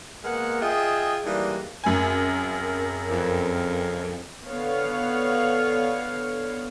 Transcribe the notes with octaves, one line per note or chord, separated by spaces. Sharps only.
G#3 A#3 B3 A#4 D#5 F#5
F4 G#4 D#5 E5 G5
E3 G3 G#3 A#3 D4 D#4
F#2 C#3 C4 A#4 G#5
F2
D3 B3 C#5 F5